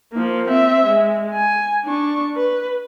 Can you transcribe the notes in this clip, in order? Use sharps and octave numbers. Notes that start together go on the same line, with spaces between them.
F3 A#3
C4 E5
G#3
G#5
D4 C#6
B4